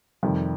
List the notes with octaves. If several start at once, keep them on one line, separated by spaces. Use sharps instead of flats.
F2 C3 D#3 G3